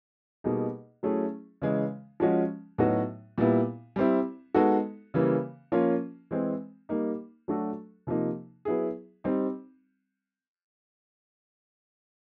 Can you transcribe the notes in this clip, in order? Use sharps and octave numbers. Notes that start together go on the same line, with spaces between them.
B2 G3 A#3 D#4 G#4
F#3 A3 C#4 E4 G#4
C#3 E3 G#3
F3 G#3 C#4 F#4
A2 F#3 B3 D#4 F#4
A#2 G3 B3 E4
G3 C4 E4
G#3 B3 D#4 F#4 A4
C#3 E3 G3 A#3
F3 A#3 C#4 F4
E3 G#3 C4
G3 A#3 D#4
F#3 A3 D4 F#4 A4
C3 F3 A#3 D#4
F#3 B3 E4 G#4
G3 C4 D#4